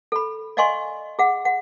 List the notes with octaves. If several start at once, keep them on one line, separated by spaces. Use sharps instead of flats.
A4 B5
D5 D#5 F5 G#5 C6 C#6
G#4 F#5
F#5